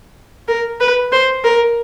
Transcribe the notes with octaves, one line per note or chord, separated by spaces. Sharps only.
A#4
B4
C5
A#4